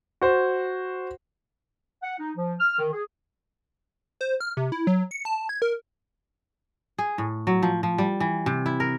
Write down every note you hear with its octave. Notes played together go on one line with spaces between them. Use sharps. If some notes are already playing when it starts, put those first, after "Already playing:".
F#4 C5
F#5
D#4
F3
F6
D#3
G#4
C5
F6
C3
E4
F#3
C#7
A5
G#6
A#4
G#4
A2
F#3
F3
F3
G3
E3
C3
E4
A#4